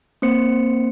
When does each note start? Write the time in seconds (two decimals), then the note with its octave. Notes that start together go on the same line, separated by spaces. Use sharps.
0.22 A#3 C4 C5 C#7